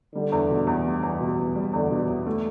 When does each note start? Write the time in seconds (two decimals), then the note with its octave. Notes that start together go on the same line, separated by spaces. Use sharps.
0.15 D3 G3
0.32 E2
0.50 B2
0.67 E2
0.86 G3
1.03 E2
1.21 B2
1.39 E2
1.55 G3
1.73 E2 D3
1.91 B2
2.08 E2
2.26 A3